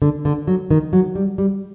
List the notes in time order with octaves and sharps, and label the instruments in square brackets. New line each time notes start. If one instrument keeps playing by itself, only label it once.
[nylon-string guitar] D3
D3
F#3
D#3
F#3
G3
G3